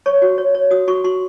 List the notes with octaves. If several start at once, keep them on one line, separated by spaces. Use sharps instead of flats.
C#5 C#6
F#4
C#5
C#5
F#4 D#6
F#4 C#6
F#4 C6